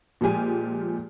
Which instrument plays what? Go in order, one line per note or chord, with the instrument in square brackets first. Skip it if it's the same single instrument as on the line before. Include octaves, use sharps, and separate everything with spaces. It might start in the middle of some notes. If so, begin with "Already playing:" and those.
[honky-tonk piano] A#2 F3 G#3 G4 G#5